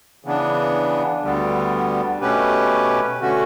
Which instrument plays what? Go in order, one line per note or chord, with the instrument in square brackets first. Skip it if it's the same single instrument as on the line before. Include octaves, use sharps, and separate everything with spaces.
[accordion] C#3 E3 B3 D4
D2 D3 G3 B3
B2 A3 C#4 G4 B4
D3 A3 C#4 F#4